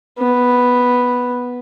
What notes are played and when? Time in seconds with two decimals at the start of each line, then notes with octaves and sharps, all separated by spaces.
0.19 B3